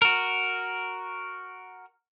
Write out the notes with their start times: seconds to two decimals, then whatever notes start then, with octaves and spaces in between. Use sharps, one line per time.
0.02 F#4 A#4